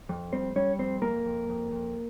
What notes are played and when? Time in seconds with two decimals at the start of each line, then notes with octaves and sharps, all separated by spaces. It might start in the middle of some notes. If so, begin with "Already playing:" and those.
0.09 F2
0.32 G3 C4 C5
0.56 G3 C#4 C#5
0.79 F2 C4 C5
1.02 F2 A#3 A#4
1.25 F2
1.49 F2
1.72 F2